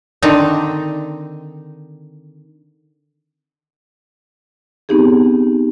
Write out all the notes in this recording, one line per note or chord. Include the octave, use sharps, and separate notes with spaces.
D3 D#3 C4 D4 D#4
B3 C4 D#4 G4 G#4